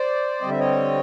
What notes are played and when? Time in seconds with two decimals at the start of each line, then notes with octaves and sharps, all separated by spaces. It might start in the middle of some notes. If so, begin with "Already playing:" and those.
Already playing: C5 D5
0.41 D3 G3 C4 D#5
0.50 E5
0.59 C#5 D#5